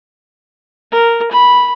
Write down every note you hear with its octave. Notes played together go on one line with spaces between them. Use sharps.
A#4
B5